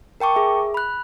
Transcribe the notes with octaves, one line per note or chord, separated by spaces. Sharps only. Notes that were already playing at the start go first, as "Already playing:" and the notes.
A#4 G5 A5 C#6 D6
G#4 E5
B5 F#6